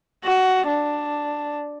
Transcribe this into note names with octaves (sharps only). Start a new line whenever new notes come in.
F#4
D4